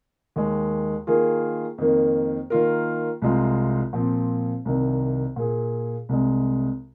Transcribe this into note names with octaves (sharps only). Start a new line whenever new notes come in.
D#2 D#3 G#3
D#3 A#3 F4 G#4
F2 D#3 A#3
D#3 A#3 F4 A#4
C2 C3 G#3 F4
A#2 F3 C4
C2 C3 D#3
A#2 A#3 G#4
C2 C3 G#3